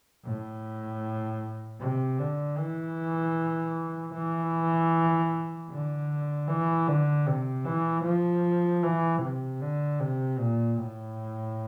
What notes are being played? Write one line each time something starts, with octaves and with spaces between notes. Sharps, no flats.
A2
C3
D3
E3
E3
D3
E3
D3
C3
E3
F3
E3
C3
D3
C3
A#2
A2